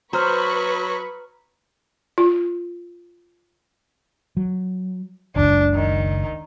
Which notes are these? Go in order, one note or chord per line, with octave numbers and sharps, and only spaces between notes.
F#3 B4 C5 A#5 B5 C#6 F6
F4
F#3
F#1 C#2 D4
D#3